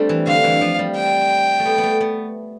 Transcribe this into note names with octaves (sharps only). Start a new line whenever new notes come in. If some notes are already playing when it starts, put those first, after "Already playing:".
Already playing: G3 A3 C4 D4
E3
D3 F5
E3
F3
G3
G5
A3
B3
B3
A3
B3